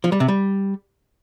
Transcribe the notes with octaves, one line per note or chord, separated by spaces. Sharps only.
F3
G3
C3
G3